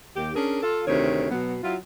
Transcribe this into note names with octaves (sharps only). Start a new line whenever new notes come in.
D#2 G4
C#4 D4 G#4 A#4
F4 A4
D2 C3 D#3 C#5
B2 F#3 B3
F#3 E4 F4